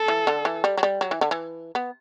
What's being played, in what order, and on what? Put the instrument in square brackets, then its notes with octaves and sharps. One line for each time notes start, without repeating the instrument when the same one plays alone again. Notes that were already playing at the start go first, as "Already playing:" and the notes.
Already playing: [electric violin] A4
[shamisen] E3
D3
E3
G3
F#3
G3
F#3
E3
D3
E3
B3